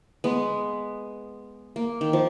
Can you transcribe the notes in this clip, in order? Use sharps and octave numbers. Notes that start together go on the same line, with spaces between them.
G#3 B3
A#3
D#3
F3